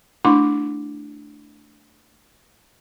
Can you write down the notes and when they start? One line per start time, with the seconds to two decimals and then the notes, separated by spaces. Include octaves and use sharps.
0.25 A3 D4 E4 C6 D6